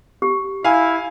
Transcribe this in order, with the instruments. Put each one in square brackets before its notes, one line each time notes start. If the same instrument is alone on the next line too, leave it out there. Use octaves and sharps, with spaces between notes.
[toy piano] G4
[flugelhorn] E4 [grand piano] F5 G#5